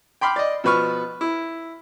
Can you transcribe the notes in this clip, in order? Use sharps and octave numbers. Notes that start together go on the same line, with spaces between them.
G5 B5 C6 D6 F6
D5 D#5
B2 F3 B4 C#6 F6
E4